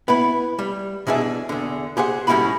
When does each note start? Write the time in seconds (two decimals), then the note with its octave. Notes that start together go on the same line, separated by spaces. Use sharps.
0.08 B3 E4 B4
0.59 G3
1.07 B2 E3 D4 G#4 E5
1.49 E2 D3
1.97 G4 G#4 C5 F#5
2.27 A2 G3 C#4 E4 F#4 B5